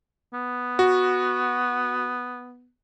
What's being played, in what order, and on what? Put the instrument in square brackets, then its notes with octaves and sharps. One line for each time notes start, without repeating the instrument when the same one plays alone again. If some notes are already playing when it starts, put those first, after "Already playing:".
[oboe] B3
[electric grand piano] F#4